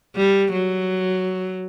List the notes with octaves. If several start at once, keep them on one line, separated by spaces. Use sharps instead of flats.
G3
F#3